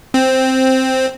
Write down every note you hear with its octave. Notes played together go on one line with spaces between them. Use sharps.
C4